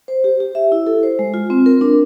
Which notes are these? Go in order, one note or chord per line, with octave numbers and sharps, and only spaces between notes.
C5
G4
G4
E5
E4
A4
C5
G#3
F4
C4
A#4
D4